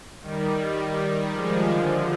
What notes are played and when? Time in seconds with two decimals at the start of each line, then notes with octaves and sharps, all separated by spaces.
0.22 D#3 G3
0.59 D#3 G3
1.33 F3 G#3
1.71 D3 F3